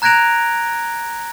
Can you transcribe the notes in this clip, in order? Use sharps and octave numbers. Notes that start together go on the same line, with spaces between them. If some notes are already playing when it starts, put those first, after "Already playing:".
A#5 F#6 G#6 A#6 D7 F7